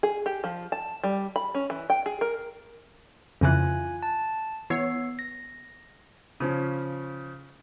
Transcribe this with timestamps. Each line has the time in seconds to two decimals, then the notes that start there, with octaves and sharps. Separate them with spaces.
0.03 G#4
0.26 G4
0.44 F3
0.72 A5
1.04 G3
1.36 B5
1.55 C#4
1.70 E3
1.90 G5
2.06 G#4
2.21 A#4
3.41 F2 C#3 E3 F4 G#5 F#6
4.03 A5
4.70 E3 B3 C#5 C7
5.19 A#6
6.40 C#3 F3 C#4